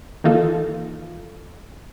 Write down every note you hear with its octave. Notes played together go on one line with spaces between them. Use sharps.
D#3 E3 A#3 D#4 F4 A4